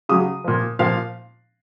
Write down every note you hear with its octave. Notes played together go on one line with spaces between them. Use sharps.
C#3 F#3 D#6
A#2 F3
A#2 F3 F5